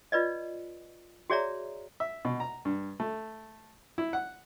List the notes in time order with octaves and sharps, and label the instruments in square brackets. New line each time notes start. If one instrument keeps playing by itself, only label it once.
[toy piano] F4 B4 D5 D#5
F#4 G#4 C#5 D5 E5 A#5
[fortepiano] E5
B2
A#5
G2
A3
E4
F#5